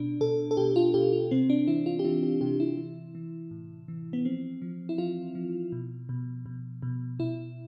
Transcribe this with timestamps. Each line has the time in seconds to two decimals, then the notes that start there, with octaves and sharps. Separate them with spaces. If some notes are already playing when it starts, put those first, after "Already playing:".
Already playing: B2 D4
0.21 B2 A4
0.51 A4
0.57 B2 G4
0.76 F4
0.94 B2 G4
1.12 F4
1.31 C3 C4
1.50 D4
1.68 E3 E4
1.86 F4
1.99 G4
2.04 E3 F4
2.23 G4
2.41 C3 G4
2.60 E4
2.78 E3
3.15 E3
3.51 A2
3.88 E3
4.13 B3
4.25 F3 C4
4.62 F3
4.89 E4
4.98 F3 F4
5.35 F3
5.72 B2
6.09 B2
6.46 B2
6.82 B2
7.19 B2 E4